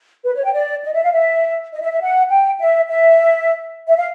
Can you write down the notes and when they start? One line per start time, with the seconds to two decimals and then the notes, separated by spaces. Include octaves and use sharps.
0.24 B4
0.35 C#5
0.44 G5
0.54 D5
0.84 D#5
0.94 E5
1.04 F5
1.13 E5
1.72 D#5
1.81 E5
1.92 E5
2.02 F#5
2.30 G5
2.60 E5
2.89 E5
3.87 E5
3.97 F5